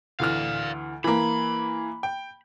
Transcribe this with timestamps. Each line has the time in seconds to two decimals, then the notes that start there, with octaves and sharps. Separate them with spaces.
0.20 D2 E3 D5 F5 F6
1.04 E3 A#3 B5
2.03 G5